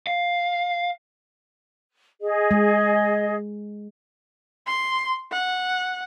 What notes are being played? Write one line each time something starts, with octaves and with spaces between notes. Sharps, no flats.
F5
G#4 D#5
G#3
C6
F#5